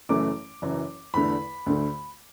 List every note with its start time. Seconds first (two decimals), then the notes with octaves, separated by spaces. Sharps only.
0.09 F#1 F#2 E3 A3 D6
0.62 F#1 F#2 E3
1.14 E2 D3 A3 B5
1.66 D2 D3 A3